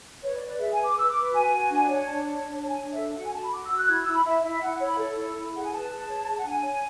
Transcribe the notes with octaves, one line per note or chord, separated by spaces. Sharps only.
B4 C#5
D5
B4
D5
G#4 E5
G#5
B4
D6
B4 E6
D6
B4
F#4 G#5
F#4
D4
C#5
G#5
D4 A5
C#5 A5
D4
A5
C#5
G#5
D4
E5
A4
F#4 F#5
G#5
F#4 A5
B5
F#4 D6
E6
F#4
F#6
E4 G#6
E6
E4
B5
E4 E5
E4 E5
E4 F#5
C#5
B5
A4
E4
E4
G#4 F#5
G#5
B4 A5
G#4
C#5
G#4
F#5
D4 G#5
C#5